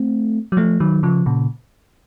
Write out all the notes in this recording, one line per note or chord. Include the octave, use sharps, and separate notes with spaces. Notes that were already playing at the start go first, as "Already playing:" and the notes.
Already playing: A3 C4
F#3
F3 A3
D#3 F#3
C#3 F3
A#2 C#3